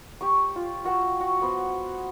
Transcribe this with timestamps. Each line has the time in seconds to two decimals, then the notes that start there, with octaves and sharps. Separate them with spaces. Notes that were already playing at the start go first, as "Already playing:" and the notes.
0.21 G4 C#6
0.56 F4
0.85 F#4 F#5 G5 E6
1.21 F#4
1.42 B3 C5